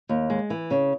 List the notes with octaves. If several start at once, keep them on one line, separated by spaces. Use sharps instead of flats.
D#2
G#3
E3
C#3